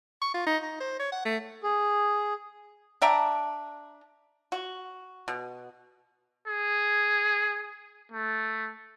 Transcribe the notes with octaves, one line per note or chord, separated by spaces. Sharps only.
C#6
F4
D#4
D#4
C5
C#5
F#5
A3
G#4
D4 E5 G5 A#5
F#4
B2
G#4
A3